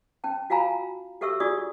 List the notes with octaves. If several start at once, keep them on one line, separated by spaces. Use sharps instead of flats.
C#4 G5 A5
F4 F#4 F5 G#5 A#5 B5
F#4 G4 A4 E5 C#6 E6
D4 F4 F#4 G#4 D5 D#6